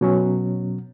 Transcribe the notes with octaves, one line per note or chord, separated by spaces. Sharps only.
B2 F#3 C#4